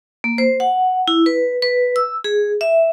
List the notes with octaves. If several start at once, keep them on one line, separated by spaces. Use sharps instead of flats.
A#3
C5
F#5
E4
B4
B4
E6
G#4
E5